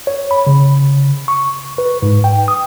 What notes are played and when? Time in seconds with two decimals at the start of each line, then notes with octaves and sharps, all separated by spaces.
0.07 C#5
0.31 B5
0.47 C#3
1.28 C#6
1.78 B4
2.02 G#2
2.24 G5
2.48 D#6